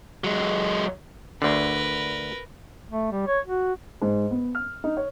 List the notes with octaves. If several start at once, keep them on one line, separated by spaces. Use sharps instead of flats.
F#3 G#3
D2 D3 A#4 B4
A3
G3
C#5
F#4
G#2
B3
F6
D#4
C#5